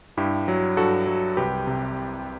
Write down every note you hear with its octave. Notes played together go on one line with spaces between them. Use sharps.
G2 E4 G4
F#3
G2 F#4 A4
F#3
C2 G4 B4
C3